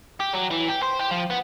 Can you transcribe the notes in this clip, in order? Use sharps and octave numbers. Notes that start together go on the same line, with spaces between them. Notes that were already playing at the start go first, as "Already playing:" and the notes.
G4
F#3
E3
G4
C5
G4
F3
B3